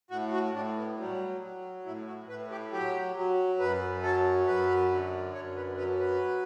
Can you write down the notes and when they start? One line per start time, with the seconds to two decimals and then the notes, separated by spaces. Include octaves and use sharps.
0.11 A2 F#4
0.32 F#4
0.54 A2 D4
0.76 B3
0.98 F#3 G3
1.41 F#3
1.86 A2 E4
2.07 F#4
2.29 A2 B4
2.50 G4
2.72 F#3 G4
3.16 F#3
3.59 F#2 B4
4.03 F#3 A4
4.47 F#2 B4
4.90 D3
5.34 F#2 C#5
5.56 B4
5.77 F#3 B4
6.00 B4